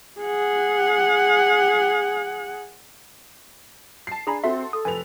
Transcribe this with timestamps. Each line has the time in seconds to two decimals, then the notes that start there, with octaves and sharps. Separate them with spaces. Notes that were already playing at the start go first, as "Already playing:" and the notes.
0.21 G#4 F#5
4.07 A5 C7
4.27 D4 G#4 G#5 A#5 B5
4.44 C4 F#4 A4 E5 C6
4.73 A4 D#6
4.85 F1 B4 G#5 F7